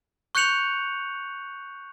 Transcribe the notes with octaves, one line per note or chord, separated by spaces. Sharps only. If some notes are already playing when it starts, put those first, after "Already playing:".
C#6 F#6 G6 C#7 F7 F#7